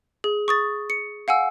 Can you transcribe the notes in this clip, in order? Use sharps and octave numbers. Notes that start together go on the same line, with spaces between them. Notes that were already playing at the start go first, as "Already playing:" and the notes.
G#4
C#6 D#6 A6
C#7
F5 F#5 G#5 E6